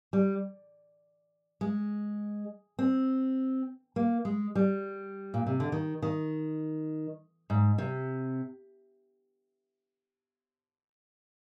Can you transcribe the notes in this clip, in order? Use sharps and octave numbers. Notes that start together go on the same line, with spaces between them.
G3
G#3
C4
A#3
G#3
G3
A#2
C3
D3
D#3
D#3
G#2
C3